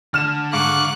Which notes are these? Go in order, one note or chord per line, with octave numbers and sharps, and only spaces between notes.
D3 F6 E7
G#2 F5 C#6 D6 F#6